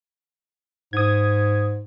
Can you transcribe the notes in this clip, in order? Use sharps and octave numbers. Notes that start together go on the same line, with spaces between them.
G#2 D#6 G#6